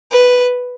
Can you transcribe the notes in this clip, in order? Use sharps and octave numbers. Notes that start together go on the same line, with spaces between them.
B4